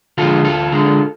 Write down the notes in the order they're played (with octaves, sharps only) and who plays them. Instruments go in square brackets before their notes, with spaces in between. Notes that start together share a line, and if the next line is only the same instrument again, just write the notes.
[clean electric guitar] D3 F3 G#3 F4 A4
D2 F4 A4
D3 G#3